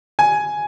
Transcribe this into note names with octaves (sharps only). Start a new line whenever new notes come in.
G#5